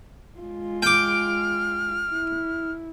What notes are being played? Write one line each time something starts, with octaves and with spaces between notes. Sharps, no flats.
G#3 F4
G5 D6 F6
E4